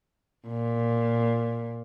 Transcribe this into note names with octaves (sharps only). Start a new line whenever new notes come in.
A#2